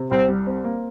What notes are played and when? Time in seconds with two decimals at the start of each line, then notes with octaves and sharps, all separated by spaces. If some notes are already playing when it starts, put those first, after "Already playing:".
Already playing: C3
0.10 C2 C4
0.28 G3
0.47 C4
0.64 A#3